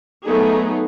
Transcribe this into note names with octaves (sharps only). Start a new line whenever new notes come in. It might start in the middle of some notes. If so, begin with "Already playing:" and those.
F#3 A3 B3 D#4 G#4